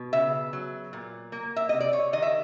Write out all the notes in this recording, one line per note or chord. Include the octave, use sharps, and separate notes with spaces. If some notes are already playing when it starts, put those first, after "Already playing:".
Already playing: B2
C#3 E5
F#3
A#2
A#3
E5
C3 D#5
D5
C#5
D#3 D#5
E5